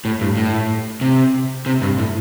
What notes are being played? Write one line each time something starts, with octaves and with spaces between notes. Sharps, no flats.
A2
G2
A2
C3
C3
G2
A2